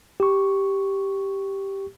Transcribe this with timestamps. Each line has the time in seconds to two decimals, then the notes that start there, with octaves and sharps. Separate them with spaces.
0.20 G4 C#6